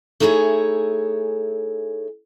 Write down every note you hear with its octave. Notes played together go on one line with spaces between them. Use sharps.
A3 D#4 E4 G#4 C#5 G#5